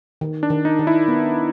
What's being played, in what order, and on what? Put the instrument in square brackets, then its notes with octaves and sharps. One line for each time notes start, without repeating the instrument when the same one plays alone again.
[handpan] D#3
[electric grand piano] D4
[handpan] D#3
[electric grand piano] D#4
[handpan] D#3
[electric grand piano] E4
[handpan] B3